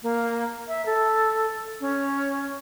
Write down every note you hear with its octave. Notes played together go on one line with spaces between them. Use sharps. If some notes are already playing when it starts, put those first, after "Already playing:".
A#3
E5
A4
C#4